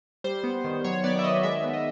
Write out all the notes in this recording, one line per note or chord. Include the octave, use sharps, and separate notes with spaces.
G3 C5
B3
D#3
F#3 C#5
B3 D5
E5
D#3 D#5
G#3 E5
B3
D#5